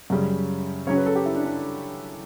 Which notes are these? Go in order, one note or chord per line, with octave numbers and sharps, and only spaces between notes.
F#2 C#3 G3
C#3 F#3 C#4 C#5
B4
A4
G4
E4
D4
D4